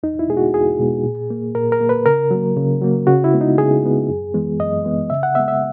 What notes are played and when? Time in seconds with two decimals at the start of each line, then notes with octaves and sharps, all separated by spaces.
0.03 E2 D#4
0.19 E4
0.28 B2 G#3 B3 G#4
0.37 F#4
0.54 E2 G#4
0.79 B2 G#3 B3
1.04 A#2
1.30 A#3
1.55 A#2 A#4
1.72 A#4
1.81 A#3
1.89 B4
2.06 C#3 A#4
2.31 F#3 A#3
2.57 C#3
2.81 F#3 A#3
3.07 C#3 F#4
3.24 E4
3.33 G#3 B3
3.41 D#4
3.58 C#3 G#4
3.83 G#3 B3
4.09 F#2
4.34 E3 G#3 B3
4.60 F#2 D#5
4.85 E3 G#3 B3
5.10 C#3 E5
5.23 F#5
5.35 G#3 B3 E5
5.48 E5